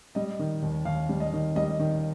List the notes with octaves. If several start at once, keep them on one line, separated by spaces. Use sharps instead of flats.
G3 D#5
D#3
D#2
D#2 F5
G3
D#5
D#3
G3 D#5
D#3